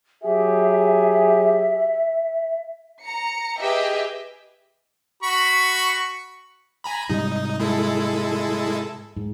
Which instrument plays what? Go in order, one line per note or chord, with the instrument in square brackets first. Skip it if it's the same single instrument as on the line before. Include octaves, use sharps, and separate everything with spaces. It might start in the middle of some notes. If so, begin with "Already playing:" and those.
[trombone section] F#3 G4 G#4 [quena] E5
[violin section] A#5 C#7
G4 G#4 B4 D#5 E5 G5
[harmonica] F#4 B5 C#6
[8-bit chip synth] G#5 A#5 B5
[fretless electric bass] G#2 C3 G3 [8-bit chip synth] D#4
[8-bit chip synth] G#3 E4 A4
[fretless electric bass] G#2